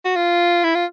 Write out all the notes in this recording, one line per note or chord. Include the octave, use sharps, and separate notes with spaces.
F#4
F4
E4
F4